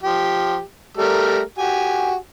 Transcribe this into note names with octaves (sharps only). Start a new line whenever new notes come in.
F3 G4
G3 A3 A#4
F#4 G4 G#5